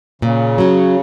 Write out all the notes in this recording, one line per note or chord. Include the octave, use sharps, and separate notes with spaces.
A#2 C#3
F#3 C#4